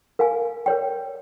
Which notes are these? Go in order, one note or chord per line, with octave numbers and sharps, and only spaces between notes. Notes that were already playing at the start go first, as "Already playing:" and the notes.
A#4 F5 G#5
A#4 C#5 G5